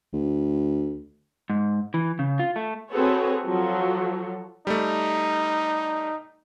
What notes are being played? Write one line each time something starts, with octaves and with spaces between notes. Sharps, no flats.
D2
G#2
E3
C#3
F4
A3
C4 F#4 G#4 A4 B4 C#5
F3 F#3 A4
G3 A3 D#4